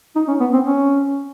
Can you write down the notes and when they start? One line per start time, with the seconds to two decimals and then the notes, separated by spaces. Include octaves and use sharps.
0.16 D#4
0.28 C#4
0.40 B3
0.53 C4
0.66 C#4